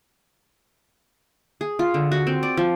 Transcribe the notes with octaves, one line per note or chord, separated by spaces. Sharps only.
G#4
F4
D3
F#4
C4
D5
F3